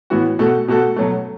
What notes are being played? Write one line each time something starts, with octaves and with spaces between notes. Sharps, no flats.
A2 E3 B3 F#4
B2 A3 F#4 A4
B2 A3 F#4 A4
B2 F#3 A3